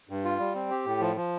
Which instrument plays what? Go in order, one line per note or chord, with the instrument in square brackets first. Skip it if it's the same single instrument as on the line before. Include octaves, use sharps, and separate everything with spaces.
[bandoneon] G2
F4
G3
C4
G4
A2
F3
F3